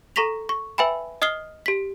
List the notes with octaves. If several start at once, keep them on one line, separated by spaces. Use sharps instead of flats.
A4 A#5 C#6 A#6 B6 F7
C#6
B4 E5 G5 G#5 B5
D#5 D#6 F6 C7 G7
G4 B6